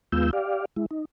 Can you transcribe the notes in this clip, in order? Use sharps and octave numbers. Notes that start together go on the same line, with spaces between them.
D#2 G#3 B3 F4 E6 G6
G4 D5 F5
G#3 E4
D#4